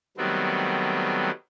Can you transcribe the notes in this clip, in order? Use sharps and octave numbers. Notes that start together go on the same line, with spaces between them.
D#3 F#3 G3 A3 B3 C4